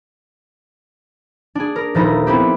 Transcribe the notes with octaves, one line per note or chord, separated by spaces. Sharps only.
D4 G#4
A#4
D#1 F3 D#4 E4 A4 A#5
B3 C4 E4 G4